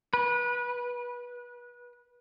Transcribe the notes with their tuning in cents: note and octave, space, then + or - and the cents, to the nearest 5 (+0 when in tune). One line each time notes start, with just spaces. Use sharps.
B4 -25